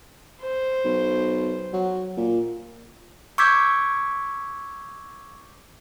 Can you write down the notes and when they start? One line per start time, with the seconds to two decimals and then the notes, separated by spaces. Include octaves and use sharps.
0.42 C5
0.84 B1
1.73 F#3
2.17 A#2
3.38 C#6 D6 E6 G6 G#6 B6